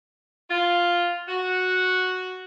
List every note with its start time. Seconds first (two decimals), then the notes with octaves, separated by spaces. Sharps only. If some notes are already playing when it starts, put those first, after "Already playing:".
0.50 F4
1.27 F#4